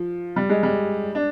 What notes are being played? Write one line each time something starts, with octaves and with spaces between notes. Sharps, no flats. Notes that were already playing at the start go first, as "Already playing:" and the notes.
Already playing: F3
G3
G#3
G3
D4